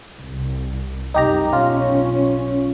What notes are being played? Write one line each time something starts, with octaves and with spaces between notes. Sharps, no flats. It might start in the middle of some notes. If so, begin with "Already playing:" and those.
C2
C2 F#2 D#4 G4 A#5
B1 C#4 F4